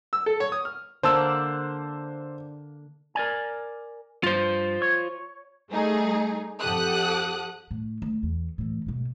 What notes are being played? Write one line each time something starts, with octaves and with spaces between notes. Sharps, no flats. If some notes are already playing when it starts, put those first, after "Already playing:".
E6
A4
C#5
D#6
F6
D3 A#3 D4 C5 A5 E6
A#4 D5 G#5
G2 F4 C5
C#5
G3 A3 D#4 G#4
F2 G4 A4 F#5 D#6 F#6
A2
D2
E2
A2 E3
G#2 B2